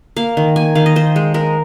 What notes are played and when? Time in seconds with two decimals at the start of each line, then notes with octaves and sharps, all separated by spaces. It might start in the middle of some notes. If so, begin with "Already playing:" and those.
0.17 A#3 F5
0.37 D#3
0.56 A#3 G#5
0.75 D#3 F5
0.86 D#5
0.96 D#3 C5
1.16 G#3
1.34 G#3 A#4